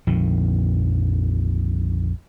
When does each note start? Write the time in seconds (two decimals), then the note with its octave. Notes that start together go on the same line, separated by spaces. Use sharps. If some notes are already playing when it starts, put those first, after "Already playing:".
0.07 A#1 F2 D#3